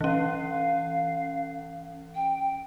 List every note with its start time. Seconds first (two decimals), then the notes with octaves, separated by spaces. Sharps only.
0.01 E3 C#4 F5
2.15 G5